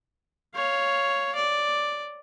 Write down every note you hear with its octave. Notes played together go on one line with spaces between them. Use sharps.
C#5 F5
D5